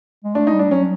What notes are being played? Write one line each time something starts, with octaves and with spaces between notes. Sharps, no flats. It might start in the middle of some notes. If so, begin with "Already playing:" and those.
G#3
A3 D4
D#4
G3
D4
F#3 C#4